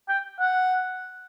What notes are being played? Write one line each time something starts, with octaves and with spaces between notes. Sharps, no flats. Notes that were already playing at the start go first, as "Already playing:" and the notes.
G5
F#5